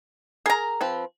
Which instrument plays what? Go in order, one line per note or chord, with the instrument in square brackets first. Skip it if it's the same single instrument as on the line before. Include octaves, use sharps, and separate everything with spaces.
[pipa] G#4 A#5 [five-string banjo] A#4
[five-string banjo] F3 C4 B4